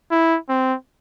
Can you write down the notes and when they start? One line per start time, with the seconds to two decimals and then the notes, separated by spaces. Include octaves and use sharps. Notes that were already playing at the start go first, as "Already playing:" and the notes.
0.11 E4
0.49 C4